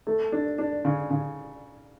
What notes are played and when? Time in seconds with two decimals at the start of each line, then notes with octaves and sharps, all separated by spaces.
0.07 A3
0.32 D4
0.58 D4
0.85 C#3
1.10 C#3